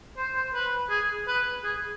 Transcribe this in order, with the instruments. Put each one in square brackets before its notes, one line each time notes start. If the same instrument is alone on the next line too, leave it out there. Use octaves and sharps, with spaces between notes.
[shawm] C5
C5
B4
G#4
B4
G#4